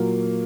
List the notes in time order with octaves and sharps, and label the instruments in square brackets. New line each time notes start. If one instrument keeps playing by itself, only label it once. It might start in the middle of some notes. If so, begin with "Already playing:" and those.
Already playing: [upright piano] A#2 F#3 A#3